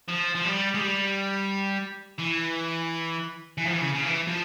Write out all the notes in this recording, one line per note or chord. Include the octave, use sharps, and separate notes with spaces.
F3
F3
G3
G#3
G3
E3
E3
F3
E3
C#3
C#3
E3
F3